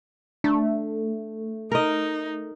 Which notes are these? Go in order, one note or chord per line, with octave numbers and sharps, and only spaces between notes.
A3 D4
D#4 A#4 D#5